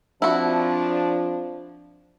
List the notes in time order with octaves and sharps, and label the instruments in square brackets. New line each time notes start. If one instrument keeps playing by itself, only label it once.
[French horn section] F3 C4 D4 [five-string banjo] E4 F#4